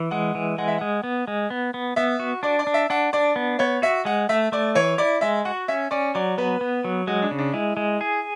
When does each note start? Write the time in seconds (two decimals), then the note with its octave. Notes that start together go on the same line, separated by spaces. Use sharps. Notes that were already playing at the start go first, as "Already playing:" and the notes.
Already playing: E3
0.11 G#3 F#5
0.35 E3
0.58 G#3 F#5
0.68 E5
0.78 G#3 F#5
1.04 B3
1.27 G#3
1.50 B3
1.74 B3
1.96 B3 E5
2.20 F#4
2.43 D4 D5
2.59 D5
2.67 D4
2.74 E5
2.90 D4 F#5
3.13 D4 D5
3.36 B3
3.59 B3 C#5
3.82 F#4 E5
4.05 G#3 F#5
4.29 A3 E5
4.52 A3 D5
4.75 E3 C#5
4.98 E4 D5
5.21 G#3 E5
5.45 F#4 F#5
5.68 C#4 E5
5.91 C#4 D5
6.15 F#3 D5
6.38 B3 B4
6.61 B3
6.84 F#3
7.07 G#3 F#4
7.22 D4
7.31 C#3
7.38 D4
7.53 G#3 E4
7.77 G#3
8.01 G#4